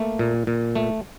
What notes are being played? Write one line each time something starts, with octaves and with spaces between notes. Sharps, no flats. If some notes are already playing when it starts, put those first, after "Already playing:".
Already playing: A3 A#3
A#2
A#2
A3